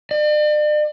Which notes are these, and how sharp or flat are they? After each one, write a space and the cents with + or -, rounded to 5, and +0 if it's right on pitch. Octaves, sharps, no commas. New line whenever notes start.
D5 +40